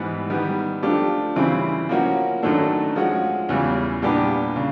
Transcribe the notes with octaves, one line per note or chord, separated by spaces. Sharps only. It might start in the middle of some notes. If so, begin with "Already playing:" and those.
Already playing: G#2 E3 G3 B3
D#3 G3 B3
F3 A3 D4 G4
C#3 E3 G3 C4 E4
F3 A#3 C#4 F#4
F#2 D#3 F#3 A3 D4
F3 G#3 C#4 F#4
E2 C#3 E3 G3
A#2 G3 B3 D4 G4
C#3